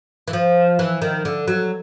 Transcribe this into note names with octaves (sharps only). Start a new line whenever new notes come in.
E3
F3
E3
D#3
D3
F#3